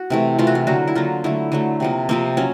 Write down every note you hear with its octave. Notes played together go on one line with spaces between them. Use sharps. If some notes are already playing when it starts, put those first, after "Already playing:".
Already playing: F#4
C3 E3 A3
C3 E3 A3 F4
F#4
F4
D3 F#3 A#3 F#4
E4
D3 F#3 A#3 F4
D3 F#3 A3 E4
D3 F#3 A3
C3 F3 A#3
C3 F3 A#3 C4
F#3 C#4